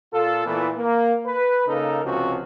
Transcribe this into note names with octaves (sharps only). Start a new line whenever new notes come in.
A#2 F4 A4
A#2 E3 A3 B3 E4
A#3
B4
C#3 A#3 D#4 A4 A#4
C#2 C3 F3 C#4 F#4